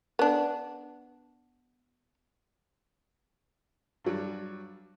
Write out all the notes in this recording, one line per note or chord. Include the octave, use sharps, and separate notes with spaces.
B3 D4
G2 F#3 G3